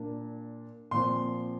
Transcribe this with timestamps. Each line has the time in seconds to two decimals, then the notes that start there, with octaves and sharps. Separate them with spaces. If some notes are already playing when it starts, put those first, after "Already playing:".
Already playing: A#2 A#3 D4
0.91 A#2 F3 C4 C6